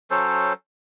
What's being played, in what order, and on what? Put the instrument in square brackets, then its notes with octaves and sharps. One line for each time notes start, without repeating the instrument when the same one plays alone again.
[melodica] F#3 C#4 A4 C5